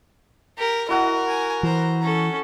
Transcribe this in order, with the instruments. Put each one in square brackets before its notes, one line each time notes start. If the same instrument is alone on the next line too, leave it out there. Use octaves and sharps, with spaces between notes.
[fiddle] G4 [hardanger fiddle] A#4
[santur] E4 F#4 F#5 [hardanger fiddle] A#4 [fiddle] D#5
[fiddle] G#5
[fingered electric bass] E3 [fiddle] C5 A#5
[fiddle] C#4 [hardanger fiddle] A4